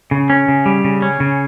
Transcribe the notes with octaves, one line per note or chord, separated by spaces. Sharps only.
C#3
C#4
C#3
G3
C#3
C#4
C#3